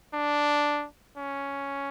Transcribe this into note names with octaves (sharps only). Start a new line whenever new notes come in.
D4
C#4